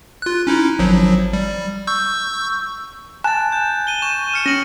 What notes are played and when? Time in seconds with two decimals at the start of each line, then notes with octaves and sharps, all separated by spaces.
0.22 F4 F#6
0.47 C#4 D#4 E4
0.79 G#1 F3 F#3
1.33 G3
1.87 C#6 E6 G6
3.24 G#5 A5 F#6 A6 E7
3.52 G6
3.87 D#7 G7
4.02 C#6 E7
4.34 F6 C#7 D#7
4.46 C#4 A#6 F#7